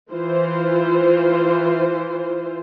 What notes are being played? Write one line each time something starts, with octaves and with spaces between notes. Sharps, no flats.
E3 F4 C5